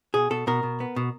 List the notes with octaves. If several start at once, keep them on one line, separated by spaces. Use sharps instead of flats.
B2 G#4
B2 A4
B2 A#4
B2
B3
B2